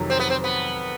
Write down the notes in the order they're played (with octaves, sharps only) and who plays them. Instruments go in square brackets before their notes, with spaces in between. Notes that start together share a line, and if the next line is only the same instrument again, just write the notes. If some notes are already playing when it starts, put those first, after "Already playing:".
Already playing: [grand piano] F2 C3 D#3 F#3
[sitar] C4
B3
C4
B3